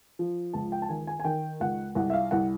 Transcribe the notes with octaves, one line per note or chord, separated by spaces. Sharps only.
F3
C#2 A5
G5
A5
D#3 G#5
G#5
G#5
D#3 G5
C#2 F#5
C2 F#5
E5
F5
C2 F#5